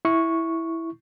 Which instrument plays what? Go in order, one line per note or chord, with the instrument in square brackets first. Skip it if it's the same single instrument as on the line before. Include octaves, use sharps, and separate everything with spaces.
[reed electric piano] E4 C#6